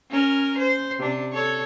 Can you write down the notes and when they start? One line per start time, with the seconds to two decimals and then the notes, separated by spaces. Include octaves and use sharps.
0.10 C#4 A#4
0.59 C5
0.99 C3 D4
1.33 A4 C#5